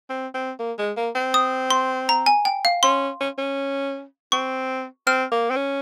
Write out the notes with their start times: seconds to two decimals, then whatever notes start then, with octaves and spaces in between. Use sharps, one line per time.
0.10 C4
0.34 C4
0.59 A#3
0.78 G#3
0.96 A#3
1.15 C4
1.34 D#6
1.71 C6
2.09 A#5
2.26 G#5
2.45 G5
2.65 F5
2.83 C#4 C6
3.21 C#4
3.38 C#4
4.32 C4 C#6
5.07 C4 F6
5.32 A#3
5.50 C4
5.56 C#4